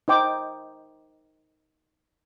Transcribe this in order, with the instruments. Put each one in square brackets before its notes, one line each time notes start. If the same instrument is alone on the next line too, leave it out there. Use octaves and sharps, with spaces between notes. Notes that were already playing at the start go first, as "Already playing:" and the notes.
[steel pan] D#4 C5 G5 D6